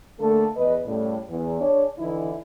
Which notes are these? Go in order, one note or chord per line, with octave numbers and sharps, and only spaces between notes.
D3 A3 A#3 A4
E2 B4 D#5
A2 C#3 G3
E2
D4 G#4 C#5
D3 E3 D#4 E4